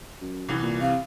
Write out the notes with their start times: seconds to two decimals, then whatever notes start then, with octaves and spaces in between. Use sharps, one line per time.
0.21 F#2
0.49 C2 E3
0.63 A#2
0.81 C3 F5